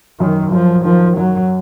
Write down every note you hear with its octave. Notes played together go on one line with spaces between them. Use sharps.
F#2 D#3
F#2 F3
D#3 F3
F#2 F#3